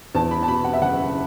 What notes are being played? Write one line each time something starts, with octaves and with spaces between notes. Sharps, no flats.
E2 A5
B5
A5
B2 B5
F#5
E5
F#1 F#5